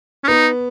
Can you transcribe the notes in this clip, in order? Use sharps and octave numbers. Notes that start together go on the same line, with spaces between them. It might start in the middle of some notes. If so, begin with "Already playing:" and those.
C#4
B3 D#4